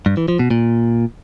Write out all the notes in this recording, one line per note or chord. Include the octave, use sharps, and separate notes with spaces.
G2
E3
F3
B2
A#2